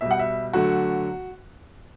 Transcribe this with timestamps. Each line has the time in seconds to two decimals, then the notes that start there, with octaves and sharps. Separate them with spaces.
0.01 B2 G3 E5
0.11 F#5
0.19 E5
0.53 D3 F#3 A3 F#4